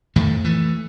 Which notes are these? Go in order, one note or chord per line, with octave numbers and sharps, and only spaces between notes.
F2 A2 D#3 A3
E3 A3